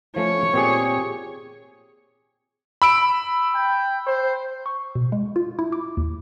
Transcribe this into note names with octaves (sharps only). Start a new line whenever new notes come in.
F3 A3 C#4 C#5
A#2 C4 G4 G#4
B5 E6 D7
G5
C5
C#6
B2
G#3
F4
E4
D6
D#2